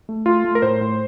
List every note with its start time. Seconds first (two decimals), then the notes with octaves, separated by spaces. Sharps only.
0.09 A3
0.26 A3 F4
0.44 A3
0.55 A#4
0.62 A2 C5
0.81 A2